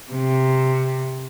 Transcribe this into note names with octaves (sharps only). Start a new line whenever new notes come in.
C3